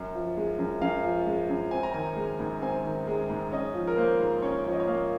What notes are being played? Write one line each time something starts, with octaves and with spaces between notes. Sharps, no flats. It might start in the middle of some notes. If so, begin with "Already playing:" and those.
Already playing: F#2
F3
G#3
F#2
F#2 F5
F3
G#3
F#2
C4 G#5
A#5
D#3 G#5
G#3
G#2
C4 G#5
D#3
G#3
G#2
C#4 D#5
F3
A#4
A#3 C5
G#2
C#4 C#5
F3 C#5
D#5
C#5
A#3 F5